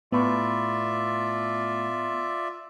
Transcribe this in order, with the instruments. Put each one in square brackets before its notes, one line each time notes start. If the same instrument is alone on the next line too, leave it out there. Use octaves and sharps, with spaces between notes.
[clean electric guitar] A2 [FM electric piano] B3 [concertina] F4 D5 E5